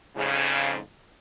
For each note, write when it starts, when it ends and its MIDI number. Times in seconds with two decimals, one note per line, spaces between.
0.16 0.78 41
0.16 0.78 44
0.16 0.78 49